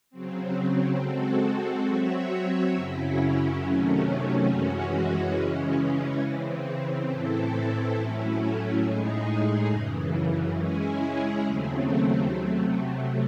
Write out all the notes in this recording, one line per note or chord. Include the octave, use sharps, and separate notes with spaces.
C#3 F#3 C4
G#3 C4 F#4 A4
F#3 C4 F#4 C#5 E5
F#2 C#3 F#3 C#4 E4
C3 D#3 F#3 A3 C#4
F#2 E3 G#3 C#4 F#4
C#3 E3 G#3 C#4
C#3 E3 C4
A2 E3 C4 E4 A4
A2 F#3 A3 C#4 E4
A2 G#3 D#4 G#4
F#2 C#3 E3
G#3 C#4 E4 G#4
D#2 C#3 F#3 A3 C4
C3 F#3 A3